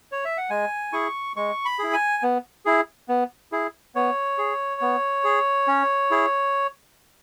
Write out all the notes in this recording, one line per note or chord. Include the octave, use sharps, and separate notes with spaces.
C#5
E5
F#5
G#3 G#5
E4 G#4 C#6
G#3 C#6
B5
E4 G#4
G#5
B3
E4 G#4
B3
E4 G#4
B3 C#5
G#4
B3
G#4
C#4
E4 G#4